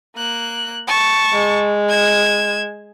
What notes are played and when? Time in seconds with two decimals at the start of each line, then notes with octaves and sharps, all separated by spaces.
0.16 A#3 F#6
0.87 A5 C#6
1.33 G#3
1.90 G#6 E7